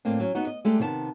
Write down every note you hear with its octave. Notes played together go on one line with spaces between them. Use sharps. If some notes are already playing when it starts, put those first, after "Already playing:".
A2 A#3 C4 D4
F#3 C#4
B3 D#4 F#4
D#5
G#3 A3 D4 G4
C3 D#3 B3 C#5 A5